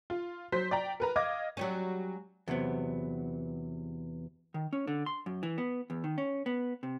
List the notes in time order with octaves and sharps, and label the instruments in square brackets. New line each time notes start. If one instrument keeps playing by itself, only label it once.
[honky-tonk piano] F4
F#3 C5 B6
D5 G5 A#5
A#4 B4 A#5
D#5 F5 D6 G#6 A#6
[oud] F#3 G3 C#4
[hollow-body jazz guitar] E2 C3 F#3 B3
D#3
C#4
D3
C6
F#2
E3
B3
E2
D#3
C#4
B3
C3